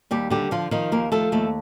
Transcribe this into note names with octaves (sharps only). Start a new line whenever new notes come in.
D#2 G3 G4
D3 G3 G4
D3 F3 F4
D#3 F3 D#4
D#2 A#3 A#4
F3 A3 A4
D#2 A3 A4